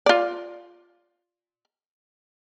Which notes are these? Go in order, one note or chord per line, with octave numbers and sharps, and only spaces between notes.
F4 D5